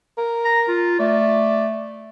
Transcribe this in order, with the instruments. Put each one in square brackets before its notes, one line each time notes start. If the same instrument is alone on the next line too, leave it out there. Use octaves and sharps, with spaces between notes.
[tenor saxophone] A#4
[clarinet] A#5
F4
[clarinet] A3 [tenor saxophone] D5